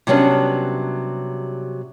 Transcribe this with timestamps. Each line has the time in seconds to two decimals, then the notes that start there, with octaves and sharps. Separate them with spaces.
0.07 C3 F#3 G3 B3 C#4 D4